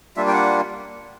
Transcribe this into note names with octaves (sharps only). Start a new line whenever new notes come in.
G3 A#3 D4 F4 E5
G5
F#5